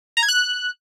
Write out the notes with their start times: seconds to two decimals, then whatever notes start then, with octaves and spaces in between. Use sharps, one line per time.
0.17 A#5
0.23 G#6
0.28 F#6